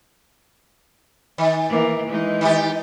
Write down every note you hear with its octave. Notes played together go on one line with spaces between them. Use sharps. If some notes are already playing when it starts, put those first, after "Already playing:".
D#3
E3 A#3
E3 G#3 D#4
D#3 G4